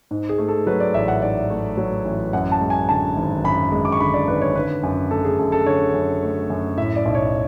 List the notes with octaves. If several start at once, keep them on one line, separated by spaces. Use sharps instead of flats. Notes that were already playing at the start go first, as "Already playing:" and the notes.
G#2
G#4
A3
A4
F#3 B4
D5
A1 E5
F#5
G#2 D5
A3
F#3
A1
F#2 F#5
A5
G#3
G#5
D3 A5
G#1
F#2 B5
G#3
D6
C#6
D3 B5
D5
G#1 B4
C#5
D3 B4
F#2
A3 A4
G#4
F#2 A4
A4
D3 C#5
F#2
A3
F#2
A2 E5
D5
B1
C#5